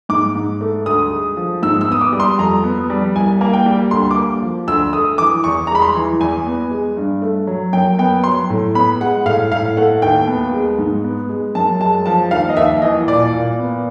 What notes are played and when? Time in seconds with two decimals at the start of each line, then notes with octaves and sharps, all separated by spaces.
0.09 G#2 D6
0.35 G#2
0.61 A3
0.86 D2 D#6
1.11 G#3
1.37 F3
1.63 G#2 E6
1.81 E6
1.88 B3 D#6
2.01 D6
2.13 G3
2.20 C6
2.38 F2 A#5
2.64 B3
2.90 G3
3.15 C2 G#5
3.41 A#3
3.53 G5
3.66 G3
3.91 D2 C6
4.11 D6
4.17 A#3
4.42 F3
4.67 D2 E6
4.93 A3 D#6
5.18 E3 D6
5.44 E2 C#6
5.67 G#3 A#5
5.75 B5
5.82 C6
5.95 E3
6.21 E2 G#5
6.47 B3
6.71 G#3
6.97 G2
7.22 A3
7.47 F#3
7.73 F#2 G5
7.98 B3 G5
8.24 F#3 C6
8.50 A2
8.74 B3 B5
9.00 G#3 F#5
9.25 A2 F5
9.52 A2 F5
9.77 A3 F#5
10.02 D#2 G5
10.28 B3
10.53 G#3
10.78 G#2
11.04 B3
11.29 G#3
11.55 F#2 A5
11.81 G#3 A5
12.06 F3 A5
12.31 D#2 F5
12.49 D#5
12.57 D#2 E5
12.82 E3 D#5
13.07 A#2 D5
13.33 A#2
13.59 B3